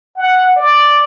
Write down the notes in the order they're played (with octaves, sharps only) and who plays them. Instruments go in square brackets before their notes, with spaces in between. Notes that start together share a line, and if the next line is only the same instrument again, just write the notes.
[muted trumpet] F#5
D5